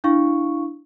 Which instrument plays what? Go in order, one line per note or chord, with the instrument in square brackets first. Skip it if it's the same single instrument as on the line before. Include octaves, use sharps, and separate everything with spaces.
[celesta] D4 E4 F5 C#6